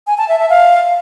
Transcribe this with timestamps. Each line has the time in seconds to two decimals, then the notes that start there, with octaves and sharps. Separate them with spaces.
0.07 G#5
0.18 A5
0.29 E5
0.39 E5
0.50 F5